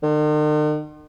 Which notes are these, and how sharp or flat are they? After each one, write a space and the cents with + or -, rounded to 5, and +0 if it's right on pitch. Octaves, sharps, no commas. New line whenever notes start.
D#3 -45